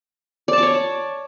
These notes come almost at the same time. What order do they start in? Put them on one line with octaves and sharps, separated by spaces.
D5 A5 D6 C#5